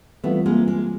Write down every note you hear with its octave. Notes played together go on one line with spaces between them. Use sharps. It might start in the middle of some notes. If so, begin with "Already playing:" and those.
E3 G3 A3 B3 C4 F4
G#3 A#3
G#3 A#3